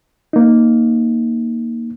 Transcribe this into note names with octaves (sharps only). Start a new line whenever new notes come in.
A#3 D#4